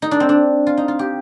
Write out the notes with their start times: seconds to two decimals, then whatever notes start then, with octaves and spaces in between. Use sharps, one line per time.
0.02 D#4
0.11 D4
0.20 C4
0.29 D4
0.67 F4
0.77 D#4
0.88 F4
0.99 G4